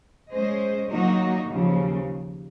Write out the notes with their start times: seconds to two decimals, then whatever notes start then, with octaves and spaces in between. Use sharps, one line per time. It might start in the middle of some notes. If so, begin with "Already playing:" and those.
0.31 G#3 C#4 G#4 C5 D#5
0.90 D#3 F#3 A#3 D#4 F#4
1.49 D#2 C#3 F3